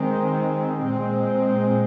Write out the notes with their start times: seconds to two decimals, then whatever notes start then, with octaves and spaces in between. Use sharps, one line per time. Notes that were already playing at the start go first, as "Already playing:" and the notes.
Already playing: D#3 G#3 C4
0.81 A#2 G#3 C4